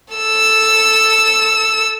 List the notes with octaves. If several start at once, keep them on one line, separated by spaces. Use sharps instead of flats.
A4 E6